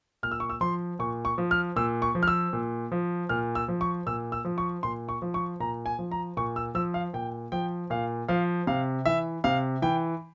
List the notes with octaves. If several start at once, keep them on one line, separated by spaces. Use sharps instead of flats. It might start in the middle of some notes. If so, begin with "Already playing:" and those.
A#2 F6
E6
C#6
E6
F3 C6
A#2 C#6
C#6
F3
F6
A#2 E6
C#6
F3
F6
E6
A#2
F3
A#2 F6
E6
F3
C#6
A#2 E6
E6
F3
C#6
A#2 C6
C#6
F3
C#6
A#2 A#5
G#5
F3
A#5
A#2 C#6
E6
F3 E6
F5
A#2 G5
F3 G5
A#2 F5
F3 F5
C3 F5
E3 E5
C3 F5
E3 G5